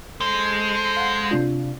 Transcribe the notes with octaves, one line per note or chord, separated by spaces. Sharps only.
G#3 A4 C5
F5 F#5
C3 D4 F4